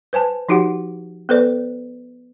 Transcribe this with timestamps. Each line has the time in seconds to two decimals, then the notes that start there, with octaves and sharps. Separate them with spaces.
0.13 B4 C5 G#5 A5
0.48 F3 D#4 F#4 G4 F#5
1.29 B3 A4 B4 C5 D5